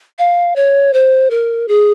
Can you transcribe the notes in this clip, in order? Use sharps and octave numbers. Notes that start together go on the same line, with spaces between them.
F5
C#5
C5
A#4
G#4